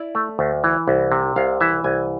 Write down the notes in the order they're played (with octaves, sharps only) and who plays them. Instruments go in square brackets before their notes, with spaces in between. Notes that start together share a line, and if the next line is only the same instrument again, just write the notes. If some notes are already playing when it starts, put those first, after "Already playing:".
Already playing: [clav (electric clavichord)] E4 D5
A3
D2
E3
C2
C3
C2 F5
E3 E5
C2 G#5